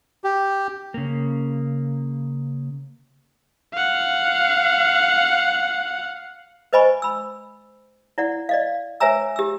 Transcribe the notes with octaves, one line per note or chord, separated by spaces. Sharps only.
G4
C#3 A#3
F5 F#5
B4 C5 D#5 G#5 B5 C#6
B5 E6
E4 D5 F#5
D5 D#5 F5
B4 C#5 E5 G#5 A#5 E6
G4 E6